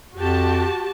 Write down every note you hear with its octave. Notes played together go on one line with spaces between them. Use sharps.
F2 F#4 G4 A5